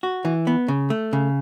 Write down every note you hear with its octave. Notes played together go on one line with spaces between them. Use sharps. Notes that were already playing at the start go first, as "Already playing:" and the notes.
F#4
E3
B3
C#3
A3
C#3